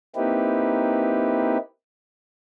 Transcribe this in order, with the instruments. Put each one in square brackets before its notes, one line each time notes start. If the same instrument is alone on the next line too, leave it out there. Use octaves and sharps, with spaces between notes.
[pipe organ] A#3 C4 D#4 E4 G4 B4